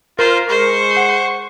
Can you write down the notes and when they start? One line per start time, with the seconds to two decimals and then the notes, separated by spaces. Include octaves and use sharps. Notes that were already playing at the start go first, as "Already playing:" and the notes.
0.19 F4 A#4 C5
0.50 G#3 G#4 C5 C#6
0.97 F#5